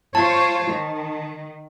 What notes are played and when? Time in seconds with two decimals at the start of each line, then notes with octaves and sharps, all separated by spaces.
0.15 F4 C5 C#5 A5
0.71 D#3